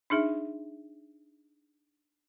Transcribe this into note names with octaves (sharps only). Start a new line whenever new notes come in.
D4 D#4 G#4 E5